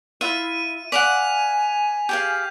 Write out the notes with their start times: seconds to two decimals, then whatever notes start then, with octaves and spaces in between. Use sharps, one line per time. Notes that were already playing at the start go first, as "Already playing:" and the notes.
0.21 E4 F4 E5 D#7
0.92 D5 F5 F#5 G#5 B6 F7
2.09 G4 G#4 F5 G6